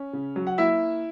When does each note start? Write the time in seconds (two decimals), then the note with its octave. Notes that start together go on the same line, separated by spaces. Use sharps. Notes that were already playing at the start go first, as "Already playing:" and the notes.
Already playing: C#4
0.13 C#3
0.36 F#3
0.47 F#5
0.58 A#3 E4 E5